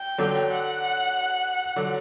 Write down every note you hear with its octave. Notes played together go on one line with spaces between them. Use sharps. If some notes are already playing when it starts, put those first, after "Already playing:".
Already playing: G5
D3 F#3
F#5
D3 F#3